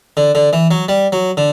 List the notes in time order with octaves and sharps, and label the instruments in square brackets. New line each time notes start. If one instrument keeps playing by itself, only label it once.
[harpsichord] D3
D3
E3
F#3
G3
F#3
D3